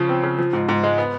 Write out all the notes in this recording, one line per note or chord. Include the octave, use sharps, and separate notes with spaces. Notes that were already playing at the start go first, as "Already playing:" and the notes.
Already playing: C#3 F3
C4
C#3
F3
G#2
G#2
G#3
B3